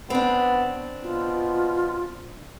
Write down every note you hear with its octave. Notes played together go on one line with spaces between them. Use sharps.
B3 C4 D4
B2 F4